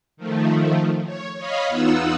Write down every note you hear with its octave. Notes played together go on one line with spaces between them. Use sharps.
D#3 F3 A3
C#5
C#5 D#5 F5 B5
E2 B3 D#4 F4 F#5 E6